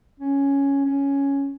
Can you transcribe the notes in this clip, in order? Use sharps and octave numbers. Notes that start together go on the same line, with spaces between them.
C#4
C#4